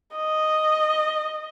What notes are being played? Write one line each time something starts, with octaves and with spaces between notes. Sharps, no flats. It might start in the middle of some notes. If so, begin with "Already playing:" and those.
D#5